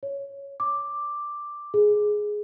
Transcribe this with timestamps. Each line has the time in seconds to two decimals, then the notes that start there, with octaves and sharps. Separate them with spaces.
0.03 C#5
0.60 D6
1.74 G#4